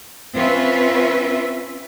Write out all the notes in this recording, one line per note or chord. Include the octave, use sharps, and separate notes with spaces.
C4 C#4 F4 B4 E5